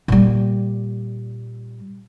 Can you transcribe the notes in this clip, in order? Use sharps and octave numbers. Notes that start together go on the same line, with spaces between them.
A#2 G3